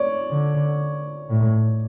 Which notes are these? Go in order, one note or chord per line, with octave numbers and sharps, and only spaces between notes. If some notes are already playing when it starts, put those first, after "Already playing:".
Already playing: C#5 D5
D3
A2